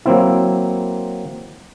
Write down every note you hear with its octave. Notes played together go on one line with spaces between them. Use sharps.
F#3 A#3 C4 E4